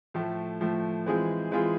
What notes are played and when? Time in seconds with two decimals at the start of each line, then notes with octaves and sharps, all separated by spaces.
0.14 A2 F3 A3
0.61 A2 F3 A3
1.06 E3 G#3 C4 F4 G#4
1.52 E3 G#3 C4 F4 G#4